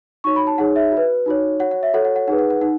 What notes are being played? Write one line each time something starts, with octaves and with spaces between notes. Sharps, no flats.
D#4 F#4 C#5 C#6
B5
A5
D#4 G#4 C#5 F#5
E5
F#4
B4
D#4 F#4 C#5
F#4 C#5 F#5
F#5
E5
F#4 A4 C#5 F#5
F#5
F#5
D#4 G#4 B4 F#5
F#5
F#5
D#4 F#5